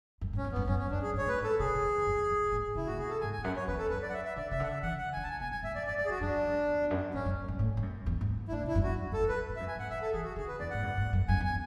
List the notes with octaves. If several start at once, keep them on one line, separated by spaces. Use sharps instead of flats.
F#2
G#2
C#4
E2
F#2 B3
F#2 C#4
C#4
F#2 D4
G#4
G#2
C#5
A2 B4
G#2
A4
B2 G#4
C#3
D3
E2
F#2
E2
F#2
G#2
A2
C#3 E4
A2 F#4
B2 G#4
A4
G#2 G#5
G#5
E2
F#2 F#5
C#5
E2 B4
A4
F#2 B4
D5
F#5
E5
E5
D3 D5
C#3 E5
D3
F#5
E5
E3 F#5
F#5
D3 G#5
A5
E3 G#5
B2 G#5
F#2 G#5
G#2 E5
F#2 D5
F#2 D5
F#2 D5
G#4
F#2 F#4
F#2 D4
G#2
E2
E2
F#2
G#2 C#4
F#2
G#2
A2
G#2
F#2
E2
G#2
E4
A2 D4
B2
E4
F#2
E2 F#4
F#2
F#2
A4
E2
F#2 B4
G#2
E5
F#2
G#5
G#2
F#5
E3 E5
A4
E3 G#4
F#4
D3 G#4
B4
E2 D5
G#2 F#5
F#2
G#2
F#2
F#2 G#5
E2 G#5